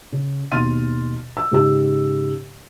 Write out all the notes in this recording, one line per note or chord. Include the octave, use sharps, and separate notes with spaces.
C#3
D#2 B2 C6 F6 A6 D#7
E6
G#2 C#3 G4 E6